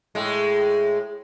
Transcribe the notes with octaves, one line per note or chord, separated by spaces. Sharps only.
A2 G#3